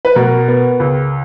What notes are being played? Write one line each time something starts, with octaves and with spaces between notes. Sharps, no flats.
B4
B2 A#4
B3
C#2